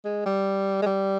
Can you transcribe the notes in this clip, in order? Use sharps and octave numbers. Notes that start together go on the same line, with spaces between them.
G#3
G3
G#3
G3